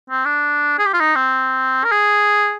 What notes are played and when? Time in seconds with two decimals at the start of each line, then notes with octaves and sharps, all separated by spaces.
0.10 C4
0.25 D4
0.79 G#4
0.86 G4
0.94 F4
1.00 D#4
1.16 C4
1.84 A#4
1.92 G#4